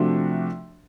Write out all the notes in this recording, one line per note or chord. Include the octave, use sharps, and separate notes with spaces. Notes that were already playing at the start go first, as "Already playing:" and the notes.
Already playing: C3 F3 A3 D4 F#4